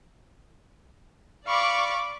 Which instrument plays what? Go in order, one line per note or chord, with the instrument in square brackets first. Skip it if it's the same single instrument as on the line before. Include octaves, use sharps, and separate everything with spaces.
[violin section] D5 B5 D6 [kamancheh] F5 C#6